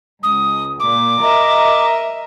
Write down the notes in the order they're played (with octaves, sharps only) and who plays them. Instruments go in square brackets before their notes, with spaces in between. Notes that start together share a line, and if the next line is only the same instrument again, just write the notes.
[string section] C#2 [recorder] D#6
[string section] A#2 [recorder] D6
[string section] A#4 D#5 E5